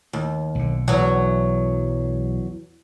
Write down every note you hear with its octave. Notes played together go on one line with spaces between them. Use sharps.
D#2
B1 D3
E2 F#3